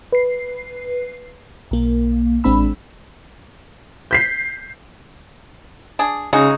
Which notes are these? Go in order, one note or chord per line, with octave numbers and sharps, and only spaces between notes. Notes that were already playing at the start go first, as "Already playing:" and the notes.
B4 C7
B1 A#3
A1 G#3 C4 D4 B5 E6
G6 B6 C7
D4 G#4
C#3 G#3 D#4 F#4 G#4